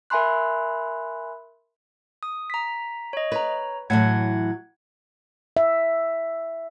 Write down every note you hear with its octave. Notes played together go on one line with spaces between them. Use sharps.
A#4 E5 G#5 B5 C6 F#6
D#6
A#5 B6
C#5 D#5
B4 C#5 A#5
A2 E3 F#3 F#5 G#6
E5